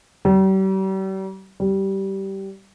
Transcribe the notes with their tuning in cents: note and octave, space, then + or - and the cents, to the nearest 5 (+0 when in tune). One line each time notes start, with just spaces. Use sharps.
G3 -40
G3 -15